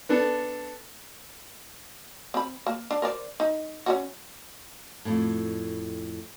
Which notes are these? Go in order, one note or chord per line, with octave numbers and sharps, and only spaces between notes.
B3 D4 A4
C4 B5
A#3
D4
A#4 C5 D5
D#4
C#4 D#4 F#4
F2 A2